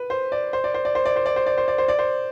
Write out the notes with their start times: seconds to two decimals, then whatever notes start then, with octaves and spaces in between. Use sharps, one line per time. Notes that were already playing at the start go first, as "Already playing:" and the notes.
Already playing: B4
0.10 C5
0.32 D5
0.53 C5
0.64 D5
0.74 C5
0.85 D5
0.95 C5
1.05 D5
1.16 C5
1.26 D5
1.36 C5
1.46 D5
1.57 C5
1.68 D5
1.78 C5
1.88 D5
1.99 C5